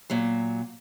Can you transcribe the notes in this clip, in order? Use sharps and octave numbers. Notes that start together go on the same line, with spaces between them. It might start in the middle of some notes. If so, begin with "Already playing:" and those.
A#2 F#3